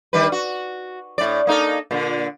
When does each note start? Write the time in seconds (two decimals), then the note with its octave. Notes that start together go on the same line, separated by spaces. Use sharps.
0.13 D#3 G3 B4
0.32 F#4
1.18 A2 D5
1.47 A#3 D#4 A4
1.91 A#2 D3